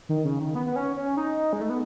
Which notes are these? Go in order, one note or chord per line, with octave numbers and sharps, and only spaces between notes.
D#3
C#3
D#3
B3
B3
C#4
C#4
D#4
G#3
A3
B3